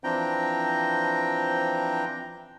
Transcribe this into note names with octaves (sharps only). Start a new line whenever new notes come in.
E3 F3 C4 D4 G5 A#5